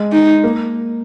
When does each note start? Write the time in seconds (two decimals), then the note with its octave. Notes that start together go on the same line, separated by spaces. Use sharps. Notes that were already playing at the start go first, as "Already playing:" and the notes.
Already playing: G#3
0.12 D#4
0.44 A#3